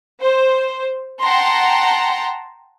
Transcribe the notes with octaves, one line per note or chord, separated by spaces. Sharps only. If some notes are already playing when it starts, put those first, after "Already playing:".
C5
F#5 G5 A5 A#5 C6